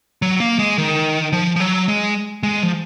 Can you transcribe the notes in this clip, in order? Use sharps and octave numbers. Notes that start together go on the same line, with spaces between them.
F#3
A#3
G#3
D#3
F3
F3
F#3
G#3
G#3
F3